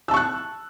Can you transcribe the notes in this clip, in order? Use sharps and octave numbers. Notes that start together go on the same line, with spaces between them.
A5 C#6 E6 F#6